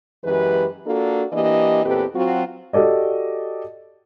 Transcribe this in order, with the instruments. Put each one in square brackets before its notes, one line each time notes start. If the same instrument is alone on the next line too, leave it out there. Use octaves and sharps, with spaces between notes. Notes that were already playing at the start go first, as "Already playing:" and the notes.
[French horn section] F#2 E3 G#3 G4 B4
A#3 D4 F4 F#4 A4
E3 A#3 D4 G4 D#5
E2 A#2 C4 G4 A4 B4
F#3 C4 F4 F#4
[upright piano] F#4 G4 A4 D5 D#5